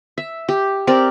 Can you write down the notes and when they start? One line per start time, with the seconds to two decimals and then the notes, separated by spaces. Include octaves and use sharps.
0.18 E5
0.49 G4
0.87 C4 G4 A#4 D5